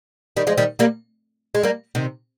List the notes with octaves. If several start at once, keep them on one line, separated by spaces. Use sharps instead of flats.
D#3 G3
F3 G#3
D#3 G3
G3 A#3
G#3
G3 A#3
C3 D#3